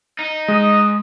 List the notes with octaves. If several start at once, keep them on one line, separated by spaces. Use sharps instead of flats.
D#4
G#3 D#5